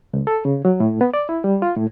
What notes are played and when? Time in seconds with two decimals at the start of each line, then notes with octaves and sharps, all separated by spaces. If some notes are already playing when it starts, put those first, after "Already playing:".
0.13 C#2
0.27 A4
0.45 C#3
0.65 F#3
0.80 A2
1.01 B3
1.14 D5
1.29 E4
1.44 G3
1.62 F4
1.76 A2